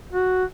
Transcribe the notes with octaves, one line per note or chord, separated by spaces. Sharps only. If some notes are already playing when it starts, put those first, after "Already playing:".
F#4